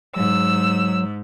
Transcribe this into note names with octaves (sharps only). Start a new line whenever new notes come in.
G#2 F#3 E6